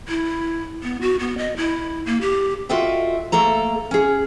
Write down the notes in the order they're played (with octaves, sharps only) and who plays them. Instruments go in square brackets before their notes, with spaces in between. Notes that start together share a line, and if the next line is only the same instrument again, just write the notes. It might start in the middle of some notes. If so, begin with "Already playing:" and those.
[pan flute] E4
B3
F#4
B3
D#5
E4
A#3
G4
[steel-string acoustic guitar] F4 F#4 A4 D#5 E5 G5
A3 A#3 A4 A#5
C#4 G#4